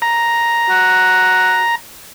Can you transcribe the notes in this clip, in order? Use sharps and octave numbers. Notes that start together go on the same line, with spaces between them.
A#5
F#4